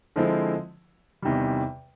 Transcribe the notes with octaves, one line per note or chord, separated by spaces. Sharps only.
D3 F3 G#3 C4 E4
E2 C3 D#3 G3